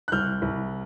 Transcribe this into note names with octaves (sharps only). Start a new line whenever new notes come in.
F#6
C2 F6 G6
C2